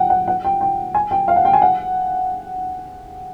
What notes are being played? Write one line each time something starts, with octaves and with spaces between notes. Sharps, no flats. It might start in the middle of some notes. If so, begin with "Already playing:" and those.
Already playing: F#5 G5
F#5
F#5
G5
G5
G#5
G5
F5
F#5
G5
G#5
F#5